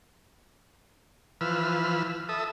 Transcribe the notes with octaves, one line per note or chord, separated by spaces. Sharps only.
E3 F3 B4 E6 F6
A4 E5 D#6